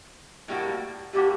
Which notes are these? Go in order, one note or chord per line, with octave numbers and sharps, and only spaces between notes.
A2 G3 A#3 F#4
A2 G3 A#3 F#4 G4